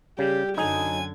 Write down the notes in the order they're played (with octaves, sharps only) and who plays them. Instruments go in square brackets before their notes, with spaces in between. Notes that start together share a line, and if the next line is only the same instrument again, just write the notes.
[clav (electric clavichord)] C#3 [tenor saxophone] G3 [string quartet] G4
[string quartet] F#2 D3 G#6 [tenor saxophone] F#3 [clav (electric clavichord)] D#4 [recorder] G#5